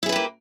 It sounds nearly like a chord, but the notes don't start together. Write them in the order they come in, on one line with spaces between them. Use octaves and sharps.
E4 G#4 B4 G4 A#3